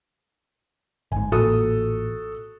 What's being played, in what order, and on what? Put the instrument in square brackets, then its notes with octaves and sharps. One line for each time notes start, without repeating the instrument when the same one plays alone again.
[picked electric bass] G1 G#2 [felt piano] G#5
[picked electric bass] A1 A#2 [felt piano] F#4 A4 D#6